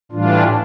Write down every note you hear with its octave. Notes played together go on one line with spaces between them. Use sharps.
A2 E3 G3 D4 F4